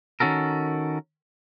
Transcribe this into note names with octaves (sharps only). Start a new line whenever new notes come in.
D#3 C#4 F#4 A4 A#4